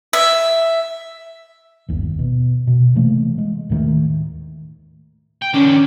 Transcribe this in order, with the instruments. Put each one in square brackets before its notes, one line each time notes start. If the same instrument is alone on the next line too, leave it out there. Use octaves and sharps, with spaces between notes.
[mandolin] E5
[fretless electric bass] G1 D#2
B2
B2
C3 E3 A3 A#3
G#3
D#2 A2 D#3 A3
[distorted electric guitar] G5
[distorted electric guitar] D#3 D4 [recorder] C#4